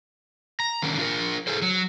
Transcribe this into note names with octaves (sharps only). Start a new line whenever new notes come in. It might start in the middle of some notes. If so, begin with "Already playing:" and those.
A#5
D3 D#3 A#3 C#4
D4 F4 A#4
G#4 A4 C5
F#3